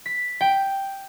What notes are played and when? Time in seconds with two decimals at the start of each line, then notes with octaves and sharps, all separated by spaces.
0.06 B6
0.41 G5